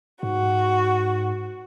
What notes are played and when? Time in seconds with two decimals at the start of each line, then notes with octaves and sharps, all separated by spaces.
0.23 G#2 F#4